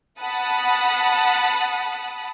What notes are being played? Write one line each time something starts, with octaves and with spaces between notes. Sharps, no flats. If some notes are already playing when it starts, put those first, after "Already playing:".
F#5 A5 B5 D#6